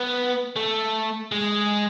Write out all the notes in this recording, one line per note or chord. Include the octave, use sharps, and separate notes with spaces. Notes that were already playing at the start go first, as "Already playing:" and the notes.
Already playing: B3
A3
G#3